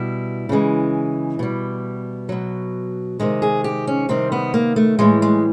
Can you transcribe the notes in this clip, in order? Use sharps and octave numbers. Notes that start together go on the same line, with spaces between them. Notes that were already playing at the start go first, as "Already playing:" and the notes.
Already playing: B2 G3 E4
C#3 E3 G#3
B2 G3
B2 F#3
C3 D#3 G#3
G#4
G4
C#4
C3 D#3 G3 C4
B3
A#3
A3
A2 E3 G3 G#3
G#3